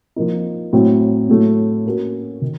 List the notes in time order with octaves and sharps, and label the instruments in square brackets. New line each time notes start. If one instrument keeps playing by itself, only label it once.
[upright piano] F3 A#3 D#4
A2 F#3 C4
A2 F#3 A3
A#3 C#4 F#4
D#3